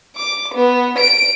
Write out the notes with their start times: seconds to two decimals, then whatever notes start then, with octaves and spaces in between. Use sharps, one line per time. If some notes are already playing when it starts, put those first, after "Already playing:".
0.16 D6
0.54 B3
0.98 D7